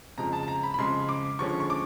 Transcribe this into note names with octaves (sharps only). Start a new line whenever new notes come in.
F2 C#3 F3 G#3 A#5
A5
A5
A#5
B5
B5
F2 C#3 F3 G#3 C6
D6
D3 F3 G#3 C#4 C#6
C#6
D6